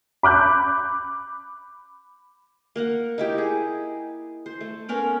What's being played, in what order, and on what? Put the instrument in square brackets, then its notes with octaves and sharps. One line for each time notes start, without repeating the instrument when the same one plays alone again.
[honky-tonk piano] B5 D6 F#6 G6
[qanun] A#3 A#4 F#5
D#4 E4 G4
G#4
C5
A3
B3 C#4 A#4 B5